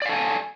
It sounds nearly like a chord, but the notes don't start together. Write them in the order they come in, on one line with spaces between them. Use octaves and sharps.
D5 F5 A4 G#5